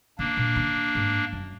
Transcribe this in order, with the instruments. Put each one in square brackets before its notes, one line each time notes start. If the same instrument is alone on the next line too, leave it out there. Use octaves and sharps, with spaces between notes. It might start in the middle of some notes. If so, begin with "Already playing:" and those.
[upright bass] D3 [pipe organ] A#3 D4
[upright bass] A#2
D3
G#2
F#2